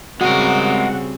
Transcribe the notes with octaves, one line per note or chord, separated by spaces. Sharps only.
C#3 G3 G#3 C4 F#4 A#4 F#5